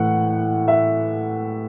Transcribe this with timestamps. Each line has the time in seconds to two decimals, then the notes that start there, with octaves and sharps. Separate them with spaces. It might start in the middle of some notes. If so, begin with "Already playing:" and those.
Already playing: A2 E3 F#5
0.68 E5